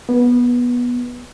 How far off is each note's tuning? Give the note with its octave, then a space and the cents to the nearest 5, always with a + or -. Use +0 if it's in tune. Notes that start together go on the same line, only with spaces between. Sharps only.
B3 -15